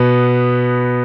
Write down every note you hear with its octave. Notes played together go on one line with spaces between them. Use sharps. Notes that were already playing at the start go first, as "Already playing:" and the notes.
Already playing: B2 B3